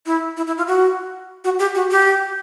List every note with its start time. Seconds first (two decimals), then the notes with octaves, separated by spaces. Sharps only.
0.06 E4
0.37 E4
0.47 E4
0.58 F4
0.68 F#4
1.44 F#4
1.59 G4
1.75 F#4
1.91 G4